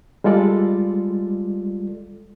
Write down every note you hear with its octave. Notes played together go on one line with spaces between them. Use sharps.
G3 G#3 F4 A4 D5